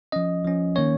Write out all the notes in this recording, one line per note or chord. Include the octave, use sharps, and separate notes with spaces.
F3 C#4 D#5
F3 C#4
D#3 A#3 C#4 C#5